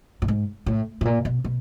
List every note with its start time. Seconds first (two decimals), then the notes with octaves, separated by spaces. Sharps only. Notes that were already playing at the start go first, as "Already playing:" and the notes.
0.22 A2
0.28 G#2
0.66 A2
1.01 A2
1.05 A#2
1.25 B2
1.44 B2